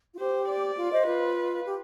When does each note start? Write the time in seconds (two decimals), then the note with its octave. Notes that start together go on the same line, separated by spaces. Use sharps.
0.14 F4
0.19 G4 C5
0.49 D5
0.78 F4
0.92 C5 D#5
1.07 F4 B4
1.65 G4